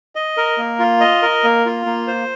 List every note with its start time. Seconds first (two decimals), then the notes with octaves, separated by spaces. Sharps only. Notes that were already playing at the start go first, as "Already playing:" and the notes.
0.15 D#5
0.37 A#4
0.58 A#3
0.79 F4
1.00 D#5
1.22 A#4
1.44 A#3
1.66 F4
1.86 A#3
2.07 C5